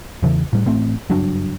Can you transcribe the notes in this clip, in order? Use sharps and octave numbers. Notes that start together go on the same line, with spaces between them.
E2 C#3 E3
A2 G3
A1 A2 A3 C4
F#1 G2 F#3 D4